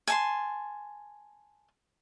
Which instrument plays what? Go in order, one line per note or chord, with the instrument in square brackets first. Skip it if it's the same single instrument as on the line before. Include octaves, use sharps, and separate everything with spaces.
[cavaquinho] G#5 A5 C6